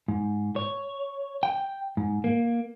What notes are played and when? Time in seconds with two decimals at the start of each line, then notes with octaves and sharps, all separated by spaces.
0.08 G#2
0.56 C#5
1.43 G5
1.97 G#2
2.24 A#3